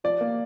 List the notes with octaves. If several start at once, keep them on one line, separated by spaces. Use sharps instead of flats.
F3 D5
A#3